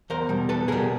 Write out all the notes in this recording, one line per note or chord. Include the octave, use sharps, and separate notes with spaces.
E2 A#4 C5
B2 G3
E2 A4 B4
B2 G3 G#4 A#4